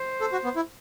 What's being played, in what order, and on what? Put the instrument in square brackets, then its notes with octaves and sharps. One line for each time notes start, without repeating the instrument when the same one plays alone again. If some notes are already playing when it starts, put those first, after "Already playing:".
Already playing: [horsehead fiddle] C5
[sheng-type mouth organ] A4
F#4
B3
E4